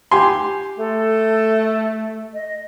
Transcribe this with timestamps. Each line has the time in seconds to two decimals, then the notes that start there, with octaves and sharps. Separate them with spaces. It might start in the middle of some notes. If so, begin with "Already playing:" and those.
0.11 G4 G#5 C6
0.78 A3 A4
2.34 D#5